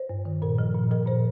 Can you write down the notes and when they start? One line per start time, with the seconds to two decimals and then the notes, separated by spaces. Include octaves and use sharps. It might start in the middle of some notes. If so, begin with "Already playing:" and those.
Already playing: C5
0.09 G2
0.25 D#3
0.42 A#2 A#4
0.59 F3
0.75 A#2
0.91 F3 A#4
1.07 A#2 C5